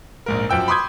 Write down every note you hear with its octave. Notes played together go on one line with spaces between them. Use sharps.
A#1 G#2 A#4
F#2 F3 G5 E6
B5 C6 D6 D#6 G6 G#6